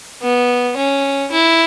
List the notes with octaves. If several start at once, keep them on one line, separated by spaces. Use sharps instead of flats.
B3
C#4
E4